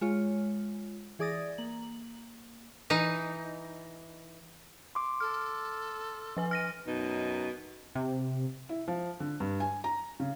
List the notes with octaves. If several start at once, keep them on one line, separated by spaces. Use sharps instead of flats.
G#3 F4 C#5
E3 G#4 D5 D#6 A6 A#6
A#3 F#7
E3 D#4
C6 D6
A4 F6
F3 B4 G#5
F6 A#6 D#7
F#2 B2 D#4
C3
E4
F3
D3
G2
G#5
A#5
C#3